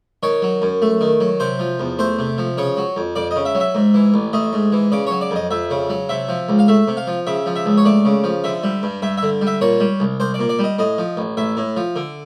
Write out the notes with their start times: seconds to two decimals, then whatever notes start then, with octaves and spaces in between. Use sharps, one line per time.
0.23 D#3 C#5
0.42 F#3
0.62 F#2
0.82 A3
1.01 D#3
1.20 F#3
1.40 C3 C5
1.59 F3
1.80 E2
1.99 A3 C5
2.19 C3
2.38 F3
2.57 C#3 C#5
2.77 F#3
2.96 F2
3.16 F2 D5
3.31 D#5
3.36 C#3
3.45 E5
3.55 F#3
3.60 E5
3.75 G#2
3.94 E3
4.14 A1
4.33 A3 D#5
4.53 G#2
4.72 E3
4.92 C#3 D5
5.07 F#3 C#5
5.21 D5
5.31 F2 D#5
5.51 F2 E5
5.71 C#3
5.90 F#3
6.09 C3 E5
6.29 F3
6.49 C#2
6.59 F5
6.68 A3 E5
6.88 C3
6.97 F5
7.07 F3
7.27 C#3 E5
7.46 F3
7.56 E5
7.66 C#2
7.77 C#5
7.85 A3 D5
8.05 C#3
8.24 F3
8.44 D3 E5
8.63 G3
8.83 G2
9.02 G2 E5
9.18 E5
9.23 D3
9.41 G3
9.47 E5
9.61 A#2 C#5
9.80 G3
10.00 C2
10.20 C2 C5
10.34 D5
10.39 A#2
10.49 D5
10.59 G3
10.64 D#5
10.79 A2 D#5
10.98 F3
11.17 A1
11.37 A1 E5
11.57 A2
11.77 F3
11.96 D3